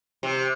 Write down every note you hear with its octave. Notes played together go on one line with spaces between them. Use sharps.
C3